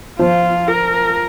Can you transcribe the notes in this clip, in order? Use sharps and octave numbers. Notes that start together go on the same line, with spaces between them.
F3 F4
A#4